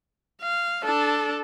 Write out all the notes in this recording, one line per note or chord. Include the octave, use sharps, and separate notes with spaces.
F5
D4 A4